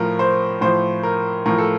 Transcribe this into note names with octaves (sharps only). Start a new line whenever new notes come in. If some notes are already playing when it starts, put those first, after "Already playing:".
Already playing: A2 F3 A#4
C5
A2 F3 C5
A#4
A2 F3 A#4
A4